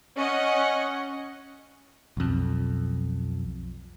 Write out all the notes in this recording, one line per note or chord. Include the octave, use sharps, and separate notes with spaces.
C#4 D#5 F#5
B1 F2